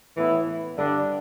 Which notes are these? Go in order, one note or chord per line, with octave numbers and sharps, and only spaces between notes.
A2 E3 B3 E4
G2 D3 G3 D4